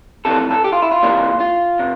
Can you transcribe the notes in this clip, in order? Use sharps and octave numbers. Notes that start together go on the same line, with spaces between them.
F2 C3 E3 A4
A4
G4
F4
E4
F4
C3 E3 G3 A#3
F4
C3